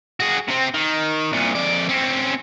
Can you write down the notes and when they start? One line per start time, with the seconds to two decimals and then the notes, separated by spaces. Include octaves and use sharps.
0.20 F#4 G#4
0.48 C3 C4
0.74 D#3
1.32 C2 A#2
1.55 F2 D5
1.89 C4 C#4